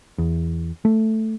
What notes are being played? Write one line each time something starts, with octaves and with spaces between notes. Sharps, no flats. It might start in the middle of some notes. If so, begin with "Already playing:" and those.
E2
A3